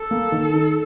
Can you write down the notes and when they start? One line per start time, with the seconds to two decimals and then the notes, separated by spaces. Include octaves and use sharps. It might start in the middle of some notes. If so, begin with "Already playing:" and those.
Already playing: A4
0.11 A#3
0.32 D#3
0.53 D#4